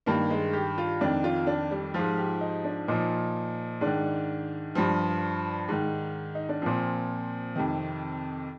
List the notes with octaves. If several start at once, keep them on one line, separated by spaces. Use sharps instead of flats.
G2 D#3 A#3
G#3
G4
F4
F2 D#3 D4
F4
D4
G3
G#2 F3 F4
G4
D#4
D4
A#2 F3 D#4
G#2 D#3 D4
G2 F3
G#2 D#3
D#4
D4
A#2 F3 C4
F2 C3 D#3